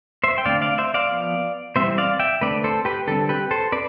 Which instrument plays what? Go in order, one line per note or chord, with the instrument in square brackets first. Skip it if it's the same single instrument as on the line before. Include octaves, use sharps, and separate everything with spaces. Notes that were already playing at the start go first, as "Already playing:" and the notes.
[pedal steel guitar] C5 E5
G5
D3 A3 C4 D5 F5
D5 F5
C5 E5
D5 F5
F3 B3
E3 G3 C4 C5 E5
D5 F5
E5 G5
D3 A3 C4 B4 D5
A4 C5
G4 B4
D3 G3 C4 A4
G4 B4
A4 C5
C4 B4 D5